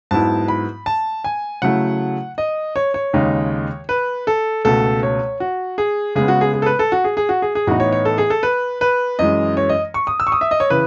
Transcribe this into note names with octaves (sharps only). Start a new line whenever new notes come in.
G#2 F#3 B3 E4 A5
B5
A5
G#5
C#3 F#3 A3 E4 F#5
D#5
C#5
C#5
D#2 C#3 G#3 D#4
B4
A4
C#2 B2 A3 A4
C#5
F#4
G#4
C#3 G#3 B3 G#4
F#4
G#4
G#4
A4
B4
A4
F#4
G#4
G#4
F#4
G#4
G#4
A2 E3 B3 D#4 F#4
C#5
C#5
A4
G#4
A4
B4
B4
F#2 E3 G#3 D#5
C#5
D#5
C#6
D#6
E6
C#6
D#6
E5
D#5
C#5
C#3 E3 B4